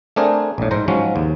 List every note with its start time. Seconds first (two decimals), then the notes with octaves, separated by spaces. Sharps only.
0.16 A3 C4 D4 G#4 A#4 C5
0.58 A#1 A2
0.71 G#2 C5 A#5
0.88 G#2 F3 F#3 C#4
1.16 D#2